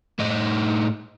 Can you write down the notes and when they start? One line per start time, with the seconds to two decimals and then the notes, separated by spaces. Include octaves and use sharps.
0.19 A2 D#4